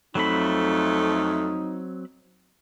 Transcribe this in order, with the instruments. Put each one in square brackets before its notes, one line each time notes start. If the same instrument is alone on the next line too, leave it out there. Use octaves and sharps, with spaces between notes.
[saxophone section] F2 A3 [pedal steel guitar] F#3 C4 B5 [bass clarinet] D#4